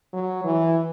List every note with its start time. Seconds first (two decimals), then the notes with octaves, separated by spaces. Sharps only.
0.13 F#3
0.44 E3